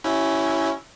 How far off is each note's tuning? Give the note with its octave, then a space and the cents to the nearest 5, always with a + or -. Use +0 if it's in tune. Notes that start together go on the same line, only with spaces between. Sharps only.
C#4 +0 E4 -5 G4 -45